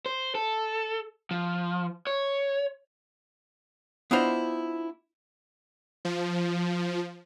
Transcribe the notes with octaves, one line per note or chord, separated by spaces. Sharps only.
C5
A4
F3
C#5
B3 D4 E4 F4 C5 D#5
F3